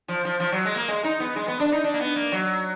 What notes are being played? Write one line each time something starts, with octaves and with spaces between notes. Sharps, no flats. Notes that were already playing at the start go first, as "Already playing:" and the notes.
F3
F3
F3
F#3
G#3
A#3
G#3
D#4
B3
G#3
B3
D4
D#4
D4
A#3
B3
A#3
F#3